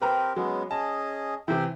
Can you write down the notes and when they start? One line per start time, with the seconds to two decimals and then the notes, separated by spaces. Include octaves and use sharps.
0.02 C4 G4 A#4 B4 A#5
0.36 F#3 G#3 B3 C#4
0.71 C#4 G#4 D#5 A5
1.48 C3 E3 E5 G5